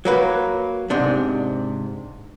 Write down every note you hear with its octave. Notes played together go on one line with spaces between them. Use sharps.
F#3 A#3 B4
G#2 C3 D4